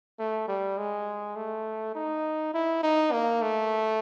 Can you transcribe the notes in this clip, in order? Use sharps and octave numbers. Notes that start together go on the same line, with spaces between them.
A3
G3
G#3
A3
D#4
E4
D#4
A#3
A3